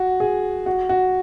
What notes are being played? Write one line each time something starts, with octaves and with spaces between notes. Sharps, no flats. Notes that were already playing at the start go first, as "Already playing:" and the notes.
Already playing: F#4
G#4
F#4
F#4